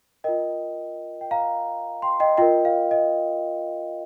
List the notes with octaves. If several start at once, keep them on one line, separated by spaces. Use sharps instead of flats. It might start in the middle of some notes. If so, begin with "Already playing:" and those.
F4 A#4 D#5 G5
G5
F5 A#5
G5 C6
D#5 G5
F4 A#4 D#5 G5
F5
D#5